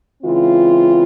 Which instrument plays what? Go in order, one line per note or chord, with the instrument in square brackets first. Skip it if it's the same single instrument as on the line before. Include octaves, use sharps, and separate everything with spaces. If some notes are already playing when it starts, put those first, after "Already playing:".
[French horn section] C#3 E3 G#3 C4 F4